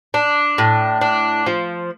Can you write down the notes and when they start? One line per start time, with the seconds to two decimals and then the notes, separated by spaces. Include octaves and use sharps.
0.14 D4
0.58 A2
1.01 D4
1.46 F3